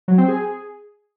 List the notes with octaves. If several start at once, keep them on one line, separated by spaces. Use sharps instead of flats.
F#3
C4
G#4